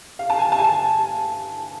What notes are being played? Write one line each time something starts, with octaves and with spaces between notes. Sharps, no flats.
F5
A5
G#5
A5
G#5